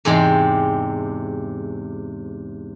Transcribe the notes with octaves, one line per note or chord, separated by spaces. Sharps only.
E2 G#2 C3 G#3 G4 C5